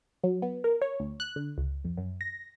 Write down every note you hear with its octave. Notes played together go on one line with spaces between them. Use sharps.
F#3
B3
A#4
C#5
D2
F#6
D3
C#2
F2
F#2
A#6